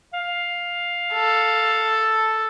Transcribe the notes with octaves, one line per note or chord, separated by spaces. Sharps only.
F5
A4